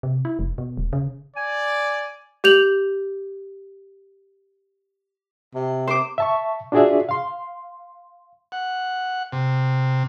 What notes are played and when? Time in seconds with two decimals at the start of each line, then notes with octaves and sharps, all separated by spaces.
0.03 C3
0.25 E4
0.39 F1
0.58 B2
0.77 D#1
0.93 C#3
1.37 D5 G#5
2.44 G4 G6 F7 F#7
5.55 C3
5.87 C5 D6
6.18 E5 A5 C#6
6.72 D4 F4 F#4 G#4 D5 E5
7.09 F5 C6
8.52 F#5
9.32 C3